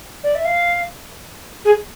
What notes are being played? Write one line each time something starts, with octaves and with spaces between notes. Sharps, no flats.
D5
E5
F5
G#4